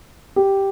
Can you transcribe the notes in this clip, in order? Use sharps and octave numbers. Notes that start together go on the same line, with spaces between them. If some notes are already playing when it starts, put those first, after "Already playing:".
G4